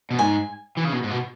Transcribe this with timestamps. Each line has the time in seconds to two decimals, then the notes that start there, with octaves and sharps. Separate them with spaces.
0.11 B2
0.19 G#2 G#5
0.77 E3
0.85 C#3
0.93 B2
1.03 G#2
1.11 B2